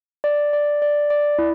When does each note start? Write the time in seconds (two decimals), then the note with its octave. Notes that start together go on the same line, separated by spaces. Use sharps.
0.24 D5
0.53 D5
0.82 D5
1.10 D5
1.38 E4